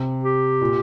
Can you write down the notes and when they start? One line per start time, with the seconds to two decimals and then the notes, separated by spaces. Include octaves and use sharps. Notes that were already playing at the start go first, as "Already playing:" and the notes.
Already playing: C3
0.24 G4
0.61 A#2